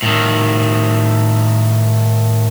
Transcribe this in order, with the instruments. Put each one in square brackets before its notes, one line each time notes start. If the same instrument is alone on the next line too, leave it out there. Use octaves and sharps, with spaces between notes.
[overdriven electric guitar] A2 D#3